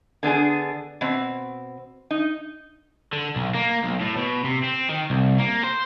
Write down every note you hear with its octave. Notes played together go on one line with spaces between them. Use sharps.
D3 B3 D4 G#4
B2 C4
D#4
D3
B1
A#3
B1
A2
B2
C3
C4
D#3
C2
A#3
C5